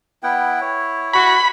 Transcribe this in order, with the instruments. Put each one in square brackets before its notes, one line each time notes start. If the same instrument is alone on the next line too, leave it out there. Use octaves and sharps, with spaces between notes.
[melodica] B3 F#5 G5 [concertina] E4
[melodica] C#5
[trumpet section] F#4 C#6 [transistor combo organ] B5